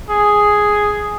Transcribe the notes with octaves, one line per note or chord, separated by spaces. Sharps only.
G#4